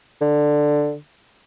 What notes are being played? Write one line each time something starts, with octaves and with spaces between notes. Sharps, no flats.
D3